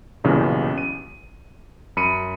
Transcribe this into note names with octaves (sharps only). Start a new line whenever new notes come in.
B1 G2 A#2 C#3 E3
D#7
F#2 B5 C#7 D#7